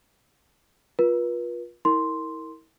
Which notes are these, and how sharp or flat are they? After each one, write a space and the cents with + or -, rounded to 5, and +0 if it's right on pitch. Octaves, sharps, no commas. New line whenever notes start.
F4 +15 B4 -40
E4 -35 A#4 -20 C6 +0